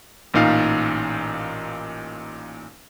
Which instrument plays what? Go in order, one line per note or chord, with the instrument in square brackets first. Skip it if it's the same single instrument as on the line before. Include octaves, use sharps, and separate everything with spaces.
[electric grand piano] A1 A#2 D#4 F5